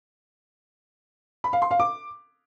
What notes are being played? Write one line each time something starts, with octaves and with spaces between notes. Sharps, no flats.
B5
F5
C6
F5
D6